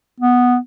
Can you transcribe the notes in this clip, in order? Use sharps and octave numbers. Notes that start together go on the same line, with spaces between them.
B3